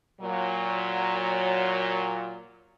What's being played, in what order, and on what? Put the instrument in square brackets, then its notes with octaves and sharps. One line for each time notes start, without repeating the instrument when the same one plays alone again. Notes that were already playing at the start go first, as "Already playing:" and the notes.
[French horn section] A#2 F#3